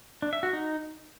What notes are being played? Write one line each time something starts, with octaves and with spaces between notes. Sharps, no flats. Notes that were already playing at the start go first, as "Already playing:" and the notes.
D4
E5
F#4
D#4